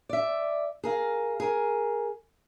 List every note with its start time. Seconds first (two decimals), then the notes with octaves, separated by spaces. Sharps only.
0.09 D5 E5
0.84 G#4 A#4 F5
1.40 G#4 A#4